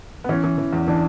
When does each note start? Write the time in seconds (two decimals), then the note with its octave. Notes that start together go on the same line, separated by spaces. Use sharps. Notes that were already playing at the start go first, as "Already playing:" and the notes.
0.24 B3
0.29 E3 C#4
0.44 E3
0.58 E3
0.73 E2
0.87 E3 D4